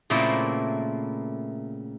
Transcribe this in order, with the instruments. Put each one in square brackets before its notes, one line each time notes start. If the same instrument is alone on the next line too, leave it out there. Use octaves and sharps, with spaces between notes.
[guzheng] A#2 C#3 A3 A#3 C4 E4